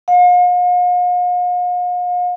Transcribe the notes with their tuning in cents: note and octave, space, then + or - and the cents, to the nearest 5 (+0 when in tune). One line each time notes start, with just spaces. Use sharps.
F5 +45